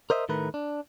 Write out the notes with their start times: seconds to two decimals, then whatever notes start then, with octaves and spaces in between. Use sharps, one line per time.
0.10 A#4 C5 D#5 E5
0.29 A2 D#3 A3 A#4 B4
0.54 D4